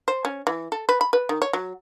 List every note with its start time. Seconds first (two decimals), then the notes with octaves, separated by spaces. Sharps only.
0.08 C5
0.25 C#4
0.47 E3
0.72 A4
0.89 B4
1.01 B5
1.13 B4
1.29 D#3
1.42 C#5
1.53 F#3